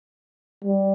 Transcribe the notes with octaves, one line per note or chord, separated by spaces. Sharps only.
G3